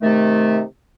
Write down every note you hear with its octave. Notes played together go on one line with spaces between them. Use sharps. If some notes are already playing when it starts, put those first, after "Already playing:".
C3 D#3 A3